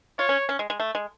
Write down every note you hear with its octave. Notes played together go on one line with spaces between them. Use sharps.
F4 C#5
C#4
C#4
G#3
G#3
A3
G#3